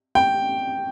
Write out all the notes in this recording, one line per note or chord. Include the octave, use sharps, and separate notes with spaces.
G5